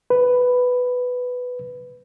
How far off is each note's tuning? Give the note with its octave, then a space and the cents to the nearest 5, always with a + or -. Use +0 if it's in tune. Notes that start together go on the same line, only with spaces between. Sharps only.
B4 +5